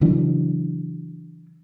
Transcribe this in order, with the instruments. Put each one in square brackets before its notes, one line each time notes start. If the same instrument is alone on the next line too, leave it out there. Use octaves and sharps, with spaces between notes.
[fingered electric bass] C#3 E3 F#3 D4